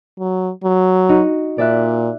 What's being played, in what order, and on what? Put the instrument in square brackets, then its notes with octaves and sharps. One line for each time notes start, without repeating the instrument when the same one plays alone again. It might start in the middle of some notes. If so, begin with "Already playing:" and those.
[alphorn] F#3
F#3
[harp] D#4 F#4
[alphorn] A#2 [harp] D5 E5 F#6